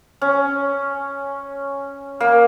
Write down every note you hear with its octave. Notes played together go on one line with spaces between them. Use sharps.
C#4
A#3